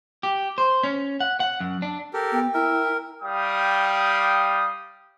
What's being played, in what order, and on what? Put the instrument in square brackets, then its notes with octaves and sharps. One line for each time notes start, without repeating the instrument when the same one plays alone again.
[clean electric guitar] G4
C5
C#4
F#5
F#5
F#2
D4
[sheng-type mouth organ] G4 A4 A#4
[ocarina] B3 [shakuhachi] G5
[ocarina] E4 [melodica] A#4 [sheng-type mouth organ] E5
[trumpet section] G3 F5 G5 D#6